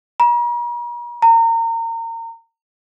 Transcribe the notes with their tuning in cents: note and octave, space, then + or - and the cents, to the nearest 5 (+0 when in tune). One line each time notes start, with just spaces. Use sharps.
A#5 +45
A#5 -30